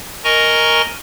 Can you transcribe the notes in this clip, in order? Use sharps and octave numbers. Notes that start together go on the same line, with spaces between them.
A#4 D#5 G#5 A#5 C#6